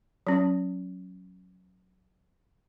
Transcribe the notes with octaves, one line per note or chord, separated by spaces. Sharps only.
F#3 C#4